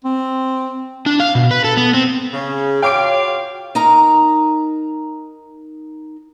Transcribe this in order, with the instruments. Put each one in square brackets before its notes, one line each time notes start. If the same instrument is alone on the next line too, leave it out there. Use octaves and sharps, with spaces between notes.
[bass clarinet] C4
[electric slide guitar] D4
F5
B2
B4
A4
B3
C4
[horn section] C#3
[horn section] F4 F#4 F5 [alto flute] C#5 [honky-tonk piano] G5 D6 D7
[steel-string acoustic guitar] D#4 A#4 A#5